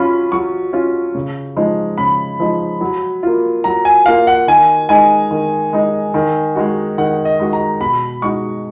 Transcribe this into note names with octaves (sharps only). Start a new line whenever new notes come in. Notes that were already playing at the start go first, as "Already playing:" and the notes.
Already playing: F#3 C#4 F4 B5
F#3 C#6
C#4 F4
C#3
F3 G#3 D#4
C#3 B5
F3 G#3 D#4
F#3
A#3 F4
F#3 A#5
G#5
A#3 F4 F5
F#5
D#3 G#5
G#3 D#4 G#5
D#3
G#3 D#4
D#3
G#3 D#4 F#4
D#3 F#5
D#5
G#3 D#4 F#4
A#5
B2 B5
G#3 D#4 F#4 C#6